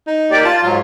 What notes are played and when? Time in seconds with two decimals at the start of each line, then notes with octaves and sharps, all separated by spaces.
0.07 D#4
0.31 A#3 G4 D5
0.45 F4 A5
0.63 G#2 F#3 F4